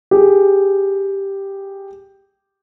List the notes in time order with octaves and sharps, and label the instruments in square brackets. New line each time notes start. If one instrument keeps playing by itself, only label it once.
[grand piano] G4 G#4